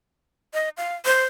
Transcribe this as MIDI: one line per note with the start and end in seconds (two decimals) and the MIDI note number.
0.54 0.69 75
0.77 0.95 77
1.05 1.24 72